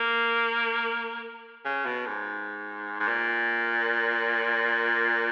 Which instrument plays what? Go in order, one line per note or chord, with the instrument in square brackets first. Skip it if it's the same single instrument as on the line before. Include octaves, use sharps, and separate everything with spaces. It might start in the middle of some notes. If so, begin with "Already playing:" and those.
Already playing: [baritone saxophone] A#3
C#3
B2
G#2
G#2
A#2